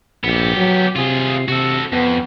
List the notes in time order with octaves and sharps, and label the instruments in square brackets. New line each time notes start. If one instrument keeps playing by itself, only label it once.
[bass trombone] A#1 [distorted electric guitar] B3 G4
[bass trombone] F#3
[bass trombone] C3 [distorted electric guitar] F4 G#4
[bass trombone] C3 [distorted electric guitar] F#4 A4
[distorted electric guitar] F2 [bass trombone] B3